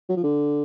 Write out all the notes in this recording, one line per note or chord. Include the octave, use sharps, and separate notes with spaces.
F#3
F3
D3